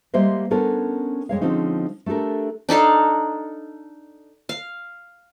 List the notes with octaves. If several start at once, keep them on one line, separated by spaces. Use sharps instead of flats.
G3 G#3 A#3 C5 D#5 E5
B3 C#4 D4 A4 A#4 C5
F2 G#3 C#5 F5
D3 F3 G#3 C4 C#4 D#4
A3 D4 G4 A4 A#4
D4 D#4 A4 F5
F5